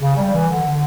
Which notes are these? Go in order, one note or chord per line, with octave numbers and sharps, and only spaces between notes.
C#3
G3
E3
D3
D3